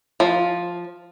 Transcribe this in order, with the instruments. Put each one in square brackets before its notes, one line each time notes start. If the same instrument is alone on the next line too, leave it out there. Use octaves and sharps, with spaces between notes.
[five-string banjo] F3